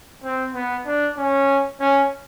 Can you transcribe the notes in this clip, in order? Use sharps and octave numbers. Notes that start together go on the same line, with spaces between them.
C4
B3
D4
C#4
C#4